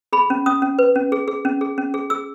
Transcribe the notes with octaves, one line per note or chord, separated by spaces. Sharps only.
G#4 B5
C#4
C#4 D#6
C#4
B4
C#4
G#4
G#4
C#4
G#4
C#4
G#4
G#4 E6